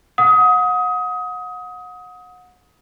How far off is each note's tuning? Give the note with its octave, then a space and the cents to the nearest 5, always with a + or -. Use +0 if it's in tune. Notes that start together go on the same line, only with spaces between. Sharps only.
F#5 -30 D#6 +25